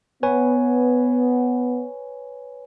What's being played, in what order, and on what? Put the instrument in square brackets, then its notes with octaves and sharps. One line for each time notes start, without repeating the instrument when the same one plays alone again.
[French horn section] B3 [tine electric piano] B4 C#5 G#5